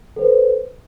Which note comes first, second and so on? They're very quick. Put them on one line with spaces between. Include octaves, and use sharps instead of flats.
A4 C5 B4